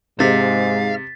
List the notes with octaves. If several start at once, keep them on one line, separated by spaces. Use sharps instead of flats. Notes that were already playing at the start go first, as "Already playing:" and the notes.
G#2 C3 F5 A6 B6